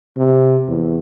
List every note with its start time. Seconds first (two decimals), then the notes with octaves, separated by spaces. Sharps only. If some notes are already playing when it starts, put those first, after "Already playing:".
0.17 C3
0.68 E2